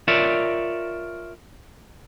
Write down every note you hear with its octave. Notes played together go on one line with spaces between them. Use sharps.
F4 A#4 C#5 D5 E5